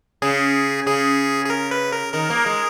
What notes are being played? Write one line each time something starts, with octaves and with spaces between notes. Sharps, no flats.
C#3 G#4
C#3 G#4
G#4
A#4
B4
A#4
D#3 A#4
A#3
G#3